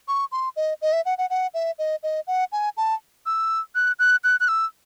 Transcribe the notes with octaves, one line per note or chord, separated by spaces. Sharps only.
C#6
C6
D#5
D#5
E5
F#5
F#5
F#5
E5
D#5
D#5
F#5
G#5
A5
E6
F#6
F#6
F#6
F#6
E6